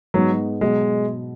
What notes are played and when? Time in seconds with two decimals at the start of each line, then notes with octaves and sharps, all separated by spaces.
0.14 G#2 F#3 G#3 B3 D#4
0.61 B2 F#3 G#3